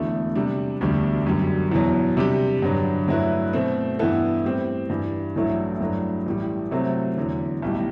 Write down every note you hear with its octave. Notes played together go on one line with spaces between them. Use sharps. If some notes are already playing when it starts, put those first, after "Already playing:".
Already playing: E1 E2 D3 A3
C3 G3 D4
E1 D2 D3 G3
F#2 D3 G3
E2 B2 F#3
C3 G3 D4 G4
G2 D3 F#3
G2 F#3 A3 E4 B4
B2 A3 C4
G2 E3 B3 E4 A4
A2 G3 C4
G2 E3 G3
A1 G2 F#3 A3 E4
G2 F#3 A3 D4
A1 A2 G3
C3 F#3 A3 C4
E2 D3 F#3
B1 A2 G3